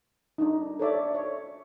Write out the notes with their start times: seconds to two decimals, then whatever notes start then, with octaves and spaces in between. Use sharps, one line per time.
0.38 D4 D#4
0.79 A4 C#5 D5 E5
1.14 C#5